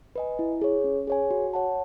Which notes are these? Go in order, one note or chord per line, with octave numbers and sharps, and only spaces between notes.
B4 D#5 G#5
E4
G#4 C#5
C#4
G#4 C#5 G#5
F#4
C#5 F#5 A5